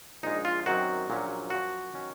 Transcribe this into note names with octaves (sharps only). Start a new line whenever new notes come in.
A#1 A#2 G#3 D#4
F4
F#2 D#3 F#3 C4 F#4
A#1 A#2 F#3 C#4
F#2 F3 A#3 F#4
D#3 F#3 C#4